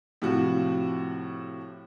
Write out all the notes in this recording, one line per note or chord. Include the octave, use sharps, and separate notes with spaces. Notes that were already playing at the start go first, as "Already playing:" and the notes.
A2 C3 F3 F#4